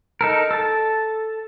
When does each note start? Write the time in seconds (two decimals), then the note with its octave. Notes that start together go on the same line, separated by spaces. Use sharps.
0.21 D#4 A4 A#4
0.51 A4 A5